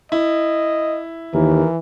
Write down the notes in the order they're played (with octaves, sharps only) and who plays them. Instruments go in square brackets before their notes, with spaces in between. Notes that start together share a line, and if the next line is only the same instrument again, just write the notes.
[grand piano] E4 [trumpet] D#5
[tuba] D#2 [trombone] E3 [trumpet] A#4